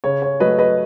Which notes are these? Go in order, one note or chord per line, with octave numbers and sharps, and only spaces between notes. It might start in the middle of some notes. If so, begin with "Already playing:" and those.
C#3 C#5
C#5
F#3 A3 B4 D#5
B4 D#5